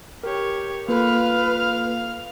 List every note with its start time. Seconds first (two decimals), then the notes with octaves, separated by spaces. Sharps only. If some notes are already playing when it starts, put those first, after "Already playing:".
0.23 G4 A#4 C#5
0.88 A#3 F4 A4 B4 F5 F6